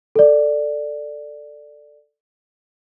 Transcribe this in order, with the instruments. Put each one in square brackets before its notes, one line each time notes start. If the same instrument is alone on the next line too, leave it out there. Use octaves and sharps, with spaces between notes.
[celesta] A4 D5